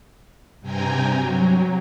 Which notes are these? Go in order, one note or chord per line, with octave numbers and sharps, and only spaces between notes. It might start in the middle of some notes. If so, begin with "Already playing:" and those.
G2 C3 G5 G#5 A#5
F#3